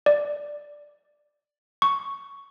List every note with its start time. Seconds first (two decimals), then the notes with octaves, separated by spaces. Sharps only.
0.06 D5
1.82 C#6